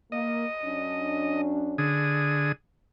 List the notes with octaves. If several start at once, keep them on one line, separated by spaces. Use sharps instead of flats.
A#3 D#5
F#2 C#4 D4
D3 G#4 D#6